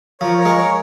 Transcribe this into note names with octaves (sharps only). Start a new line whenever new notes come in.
F3 A#4 C#5
A#4 C#5
G#3
A#4 C#5